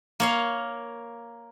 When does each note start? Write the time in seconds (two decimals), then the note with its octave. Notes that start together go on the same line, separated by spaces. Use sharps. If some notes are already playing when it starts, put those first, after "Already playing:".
0.20 A#3 C#5 F5